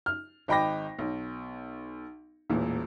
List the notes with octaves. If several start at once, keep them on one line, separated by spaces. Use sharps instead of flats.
F6
G#1 D#5 G5 B5 D6 A#6
B1
E1 A1 A#2